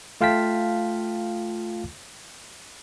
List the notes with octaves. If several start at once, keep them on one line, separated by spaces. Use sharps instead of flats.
A3 F4 F5 G5 A5 B6